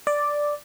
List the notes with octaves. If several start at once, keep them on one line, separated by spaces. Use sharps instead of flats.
D5